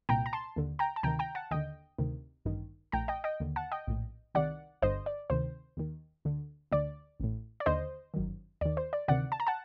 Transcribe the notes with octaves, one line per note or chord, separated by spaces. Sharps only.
C2 A#2 G5 A#5
A#5
A5 C6
D#2 D3
G5 A#5
A5
D2 C3 D#3 G5 A#5
G5 A#5
F#5 A5
D#2 D3 D#5 G5
D2 C3 D#3
A1 G2 D#3
A#1 A2 G5 A#5
D#5 G5
D#5 G5
D#2 D3
F#5 A5
D#5 G5
A#1 A2
C2 C3 D#3 D5 F#5
G1 G2 D3 C5 D#5
D5
D2 C3 D#3 C5
D#2 D#3
D2 D3
D2 D3 D5
A1 A2
D5
D#2 D3 C5 D#5
G1 F#2 D#3
D#2 D#3 D5
C5
D5
D2 C3 D#3 D5 F#5
A5
A#5
F#5 A5